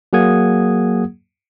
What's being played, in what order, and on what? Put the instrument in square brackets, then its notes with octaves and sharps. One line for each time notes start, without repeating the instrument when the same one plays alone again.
[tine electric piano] F#3 A#3 G#4 F#5 D#6 G#6